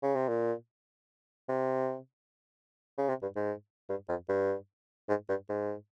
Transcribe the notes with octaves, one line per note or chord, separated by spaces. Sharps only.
C#3
C3
A#2
C3
C#3
C3
G2
G#2
G2
F2
G2
G#2
G2
G#2